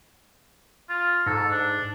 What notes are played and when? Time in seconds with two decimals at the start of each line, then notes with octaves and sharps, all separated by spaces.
0.90 F4
1.26 G#2 A4
1.51 D4